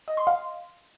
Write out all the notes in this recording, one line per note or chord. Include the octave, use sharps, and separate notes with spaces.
D#5
C6
F5